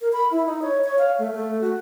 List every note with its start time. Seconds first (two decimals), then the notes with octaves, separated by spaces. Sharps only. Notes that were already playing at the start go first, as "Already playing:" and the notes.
0.01 A#4
0.13 B5
0.31 E4
0.46 D#4
0.62 C#5
0.84 C#5
0.99 F5
1.19 A3
1.32 A3
1.61 F#4